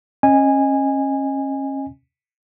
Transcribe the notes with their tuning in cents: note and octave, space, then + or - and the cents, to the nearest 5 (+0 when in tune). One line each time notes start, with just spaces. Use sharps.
C#4 -30 D#5 +0 G#5 -15